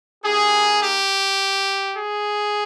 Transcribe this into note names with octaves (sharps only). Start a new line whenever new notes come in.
A#3 D#4 G4 G#4
G4
G#4